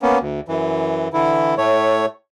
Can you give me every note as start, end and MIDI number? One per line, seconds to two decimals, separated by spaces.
0.02 0.18 58
0.02 0.18 59
0.02 0.18 61
0.20 0.40 38
0.48 1.08 42
0.48 1.08 52
1.13 1.54 50
1.13 1.54 52
1.13 1.54 64
1.57 2.06 45
1.57 2.06 57
1.57 2.06 73